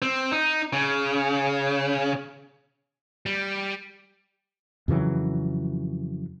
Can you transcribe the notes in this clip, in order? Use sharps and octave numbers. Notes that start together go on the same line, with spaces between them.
C4
D#4
C#3
G3
F2 C#3 E3 F#3